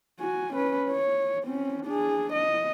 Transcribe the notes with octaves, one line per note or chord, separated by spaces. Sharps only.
F#4 G#5
C#4 B4
C#5
C4 C#4
D4 G#4
D#5